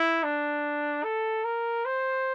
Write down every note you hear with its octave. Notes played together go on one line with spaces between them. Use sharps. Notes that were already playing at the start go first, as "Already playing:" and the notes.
Already playing: E4
D4
A4
A#4
C5